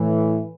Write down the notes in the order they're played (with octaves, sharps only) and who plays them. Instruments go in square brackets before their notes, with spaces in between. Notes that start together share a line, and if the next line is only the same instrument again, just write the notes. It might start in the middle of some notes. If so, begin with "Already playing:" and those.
Already playing: [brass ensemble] A2 E3